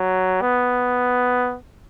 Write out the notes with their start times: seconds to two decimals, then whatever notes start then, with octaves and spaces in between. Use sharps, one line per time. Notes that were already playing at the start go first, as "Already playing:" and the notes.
Already playing: F#3
0.42 B3